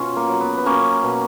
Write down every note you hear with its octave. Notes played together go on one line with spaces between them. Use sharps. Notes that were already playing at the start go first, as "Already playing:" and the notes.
Already playing: B2 C#4 F4
A#3
F#3
B3
B3
F#3 A#3 C#4
B2